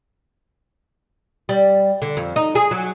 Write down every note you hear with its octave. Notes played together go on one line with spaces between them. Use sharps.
G3
D3
F2
D#4
G#4
F#3